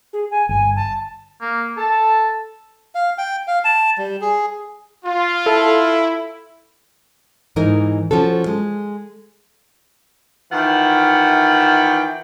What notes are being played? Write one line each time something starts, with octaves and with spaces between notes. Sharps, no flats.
G#4
G#5
G1 G#5
A5
A#3
A4 A5
F5
G5
F5
A5
G3
G#4
F4
E4 A4
G#2 E3 D#4 A#4
F3 C#4 F#4 A4
G#3
D#3 E3 F4 F#5 G5